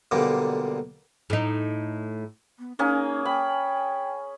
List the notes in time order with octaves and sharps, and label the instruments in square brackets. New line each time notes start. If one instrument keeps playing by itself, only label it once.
[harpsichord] B1 A#2 D3 G3 A#3
[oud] A2 D#4
[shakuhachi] B3
[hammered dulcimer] A#3 C#4 G#4 [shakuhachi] D#4
[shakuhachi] G5 [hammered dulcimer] B5